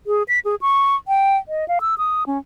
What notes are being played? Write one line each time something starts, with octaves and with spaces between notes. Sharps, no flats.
G#4
B6
G#4
C#6
G5
D#5
F5
E6
D#6
C#4